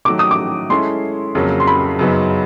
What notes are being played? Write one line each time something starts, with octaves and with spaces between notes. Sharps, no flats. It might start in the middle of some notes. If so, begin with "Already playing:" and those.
D#3 F#3 A3 D6
D#6
D6
G#3 C#4 E4 A4 C6
F2 C#3 F#3 A#3
C6
B5
F#2 C#3 F#3 B3 D#4